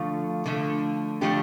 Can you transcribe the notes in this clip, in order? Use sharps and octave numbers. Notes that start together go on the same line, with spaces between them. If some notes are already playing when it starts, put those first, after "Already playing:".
Already playing: D3 F3 A3 F4
D3 F3 A3
D3 F3 A3 G4